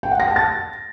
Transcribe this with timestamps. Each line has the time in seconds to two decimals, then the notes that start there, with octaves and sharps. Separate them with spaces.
0.03 G5
0.11 F#5
0.20 A#6
0.28 A5
0.36 A6